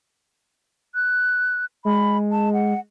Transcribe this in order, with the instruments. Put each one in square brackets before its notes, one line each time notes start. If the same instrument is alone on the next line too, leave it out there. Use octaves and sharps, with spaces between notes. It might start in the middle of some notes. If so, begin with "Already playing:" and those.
[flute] F#6
[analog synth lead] G#3 [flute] B5
[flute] A5
F#5